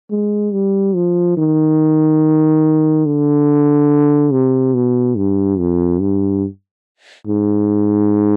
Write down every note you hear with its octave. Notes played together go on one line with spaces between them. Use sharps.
G#3
G3
F3
D#3
D3
C3
B2
G2
F2
G2
G#2